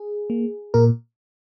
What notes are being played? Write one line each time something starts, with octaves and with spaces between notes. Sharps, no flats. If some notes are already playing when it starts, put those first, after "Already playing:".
Already playing: G#4
A#3
A#2 A#4